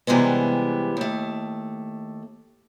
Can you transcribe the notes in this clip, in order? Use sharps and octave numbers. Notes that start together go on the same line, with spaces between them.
C3 E3 G3 G#3 B3
D#2 A3